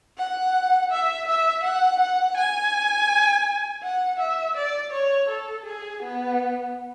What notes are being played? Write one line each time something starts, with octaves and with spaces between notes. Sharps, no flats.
F#5
E5
E5
F#5
F#5
G#5
F#5
E5
D5
C#5
A4
G#4
B3